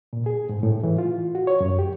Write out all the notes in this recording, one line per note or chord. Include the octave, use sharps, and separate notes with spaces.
A#2
G#4
G#2
A2
E3
F4
F#4
C#5
F#2
G4